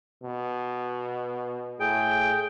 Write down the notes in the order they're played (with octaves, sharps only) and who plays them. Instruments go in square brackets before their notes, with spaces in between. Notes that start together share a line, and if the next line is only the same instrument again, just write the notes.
[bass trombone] B2
[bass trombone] A2 [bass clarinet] G#4 [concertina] G5